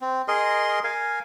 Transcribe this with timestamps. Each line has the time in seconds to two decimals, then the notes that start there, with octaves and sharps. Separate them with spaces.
0.01 C4
0.28 G#4 A#4 D#5 C6
0.84 A#4 F5 G#5